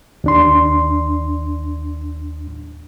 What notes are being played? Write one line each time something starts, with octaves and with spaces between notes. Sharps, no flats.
D#2 D4 C6